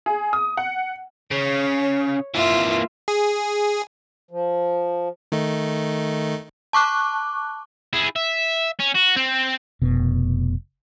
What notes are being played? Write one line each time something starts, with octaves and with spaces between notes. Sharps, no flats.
G#4
D#6
F#5
C#3 C#5
E3 A#3 F4 E5
G#4
F3
D#3 A3 D#4
A5 C#6 D6 F#6
E4 G#4
E5
C#4
F#4
C4
F1 B2